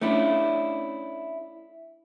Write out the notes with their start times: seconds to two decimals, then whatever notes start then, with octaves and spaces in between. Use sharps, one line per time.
0.01 A3 C#4 D4 E4